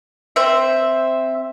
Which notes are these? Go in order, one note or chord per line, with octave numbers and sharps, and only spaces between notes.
C4 C5 E5